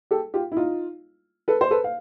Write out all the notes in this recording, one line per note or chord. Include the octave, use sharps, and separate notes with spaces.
G4 A4
F4 G4
E4
D#4 F4
A4 B4
C5
A4 B4
F5